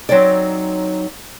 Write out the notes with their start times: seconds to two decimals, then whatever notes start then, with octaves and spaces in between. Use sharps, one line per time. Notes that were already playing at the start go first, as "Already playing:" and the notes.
0.09 F#3 C4 D#4 C#5 D5